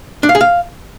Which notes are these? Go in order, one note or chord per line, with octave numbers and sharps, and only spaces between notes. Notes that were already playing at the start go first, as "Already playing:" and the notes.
D4
F5
G#4
F5